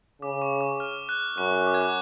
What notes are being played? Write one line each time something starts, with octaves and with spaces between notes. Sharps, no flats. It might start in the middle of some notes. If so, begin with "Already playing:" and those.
C#3 D6
C#6
D6
F6
F#6
F#2 C#6
D6
G#6
F#6